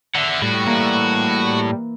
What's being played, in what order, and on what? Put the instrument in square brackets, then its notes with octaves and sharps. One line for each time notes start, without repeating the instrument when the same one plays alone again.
[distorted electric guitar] D3 [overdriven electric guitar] E5 F#5
[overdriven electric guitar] A2 [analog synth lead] G3 [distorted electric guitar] F#4
[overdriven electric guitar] A2 [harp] E3 A#3